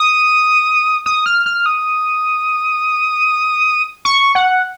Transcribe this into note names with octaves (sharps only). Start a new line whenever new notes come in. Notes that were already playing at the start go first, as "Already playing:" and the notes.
Already playing: D#6
D#6
F6
F6
D#6
C#6
F#5